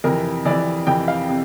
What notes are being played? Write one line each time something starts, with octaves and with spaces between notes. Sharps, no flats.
F2 C3 E3 A#4
F2 C3 E3 D5
F2 C3 E3 G5
F5
C3